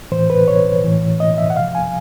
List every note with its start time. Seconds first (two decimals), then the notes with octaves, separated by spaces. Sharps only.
0.12 A2 E3 C5
0.30 B4
0.48 C#5
0.84 A2 E3
1.20 D#5
1.38 E5
1.50 F#5
1.56 C3 F3 F5
1.75 G#5